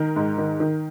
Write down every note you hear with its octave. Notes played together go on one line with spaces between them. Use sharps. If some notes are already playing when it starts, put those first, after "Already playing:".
Already playing: D#3 A#4
G#2
D#3
D#3